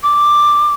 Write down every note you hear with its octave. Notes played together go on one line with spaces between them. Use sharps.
D6